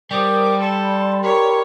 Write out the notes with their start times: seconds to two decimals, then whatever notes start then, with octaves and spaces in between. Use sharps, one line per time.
0.11 G3 A#4 C5 D6 D#6
0.60 A4 D5 B5 C6
1.23 G4 A#4 C#5